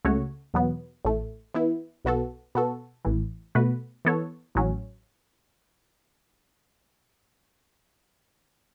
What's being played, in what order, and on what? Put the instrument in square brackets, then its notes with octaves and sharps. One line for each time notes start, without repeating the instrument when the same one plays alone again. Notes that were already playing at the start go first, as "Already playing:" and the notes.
[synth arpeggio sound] C#2 C#3 A3 F#4 C#5
E2 B2 F#3 B3
A1 A2 A3
E3 B3 E4
B1 B2 B3 F#4 A4
B2 B3 F#4 A4
A1 A2 E3
B2 A3 F#4 B4
E3 B3 A4 C#5
A1 A2 F#3 C#4